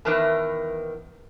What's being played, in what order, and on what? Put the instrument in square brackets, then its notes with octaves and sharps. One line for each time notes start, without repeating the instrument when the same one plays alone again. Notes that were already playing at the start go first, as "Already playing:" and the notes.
[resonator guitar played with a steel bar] E2 D#3 E3 A#4 B4 A5